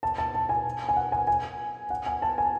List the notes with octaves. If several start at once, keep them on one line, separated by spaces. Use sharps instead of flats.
A5
A5
A5
G#5
G#5
F#5
G#5
G#5
F#5
G#5
A5
G#5